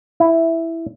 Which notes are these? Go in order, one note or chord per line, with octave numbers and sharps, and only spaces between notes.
E4